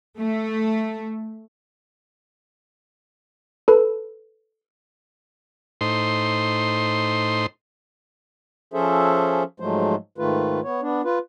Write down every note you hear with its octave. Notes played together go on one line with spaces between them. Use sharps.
A3
A4 B4
A2 D#4 C5 C6
F3 C#4 G#4 A4 C5 E5
G#2 F3 F#3 G#3 A3 C5
G#2 D#3 A3 F4 B4
B3 C#5
B3 D4
F4 B4